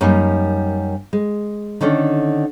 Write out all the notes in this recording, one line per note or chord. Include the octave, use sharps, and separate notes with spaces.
F#2 G3 A#3 D#4
G#3
D3 D#3 C#4 D4 A4